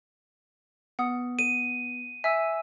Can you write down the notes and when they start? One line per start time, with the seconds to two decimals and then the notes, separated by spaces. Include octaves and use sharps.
0.99 B3 F#5 D#6
1.39 D#7
2.24 E5 G#5 E6